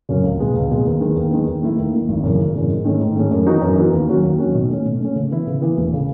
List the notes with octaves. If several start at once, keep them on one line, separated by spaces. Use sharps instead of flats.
F#2 C#3 F#3 C#4
C#2
B2 G#3 B3
C#2
B2 G#3 B3
D#2
D#3 G#3 B3
D#2
D#3 G#3 B3
D#2
D#3 A3 E4
D#2
D#3 A3 E4
G#1
F#2 C#3 E3 G#3
G#1
F#2 C#3 E3 G#3
G#2
D#3 A3 C#4 G#4
G#2
D#3 A3 C#4 G#4
F#2
E3 B3 D#4 F#4
F#2
E3 B3 D#4 F#4
D#2
D#3 F#3 C#4 F#4
D#2
D#3 F#3 C#4 F#4
B2
A3 C#4
B2
A3 C#4
C#3
E3 B3 E4
C#3
E3 B3 E4
E1
C#3